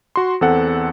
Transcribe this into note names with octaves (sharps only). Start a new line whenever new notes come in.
F#4 C6
E2 C4 A4 F#5